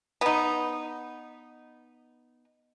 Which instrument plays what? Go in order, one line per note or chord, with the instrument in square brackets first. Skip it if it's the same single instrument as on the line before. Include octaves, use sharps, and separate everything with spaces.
[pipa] B3 D#4